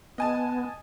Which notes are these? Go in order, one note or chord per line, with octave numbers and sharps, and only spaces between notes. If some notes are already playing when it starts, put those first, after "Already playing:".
B3 D#5 G#5 A5